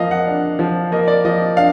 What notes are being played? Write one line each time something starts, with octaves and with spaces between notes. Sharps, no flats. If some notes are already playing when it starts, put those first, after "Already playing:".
Already playing: F3 A#3 D#5 F5
F#5
D4
F3
A#3 D#5
D5
F3 D#5
D4 F5